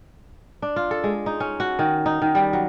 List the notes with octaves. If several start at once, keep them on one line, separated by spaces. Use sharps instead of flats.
D4
F4
A4
G#3
D#4
C#4
F#4
D#3
D#4
D#3
G3
F#3